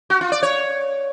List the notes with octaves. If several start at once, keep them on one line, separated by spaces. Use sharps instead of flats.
F#4
F4
D5
C#5